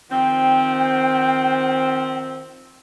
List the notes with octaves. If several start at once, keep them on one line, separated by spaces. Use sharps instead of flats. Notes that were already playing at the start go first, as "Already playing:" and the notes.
D#3 F3 C4 G5